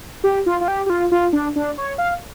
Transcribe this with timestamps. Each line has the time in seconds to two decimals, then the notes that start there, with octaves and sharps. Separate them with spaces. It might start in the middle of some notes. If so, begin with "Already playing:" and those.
0.24 G4
0.46 F4
0.61 F4
0.68 G4
0.86 G4
0.90 F4
1.12 F4
1.33 D4
1.56 D4
1.78 C#5
1.98 F5